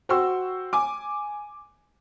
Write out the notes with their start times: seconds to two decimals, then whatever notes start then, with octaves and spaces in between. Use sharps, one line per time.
0.09 F#4 C5 G5 C6 C#6 E6
0.73 G#5 D6